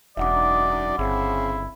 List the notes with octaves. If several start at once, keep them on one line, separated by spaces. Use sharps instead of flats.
E1 F#2 D4 D#4 D5 E5 F#5 D6
G1 C#3 C4 E4